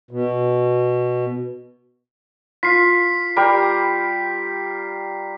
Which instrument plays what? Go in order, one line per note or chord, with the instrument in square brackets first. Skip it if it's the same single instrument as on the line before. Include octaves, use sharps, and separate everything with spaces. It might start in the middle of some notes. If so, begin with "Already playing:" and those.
[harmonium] B2
[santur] F4 [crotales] B6 C7
[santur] G3 G4 A#4